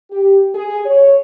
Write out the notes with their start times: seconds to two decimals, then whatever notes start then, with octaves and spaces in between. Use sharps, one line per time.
0.11 G4
0.54 G#4
0.85 C#5